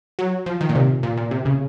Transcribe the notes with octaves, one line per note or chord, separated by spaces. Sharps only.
F#3
F3
D#3
A#2
C3
A#2
A#2
C3
C#3